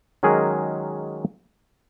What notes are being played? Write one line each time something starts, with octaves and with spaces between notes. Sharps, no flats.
D#3 F#3 G#3 C#4 G#4 A#4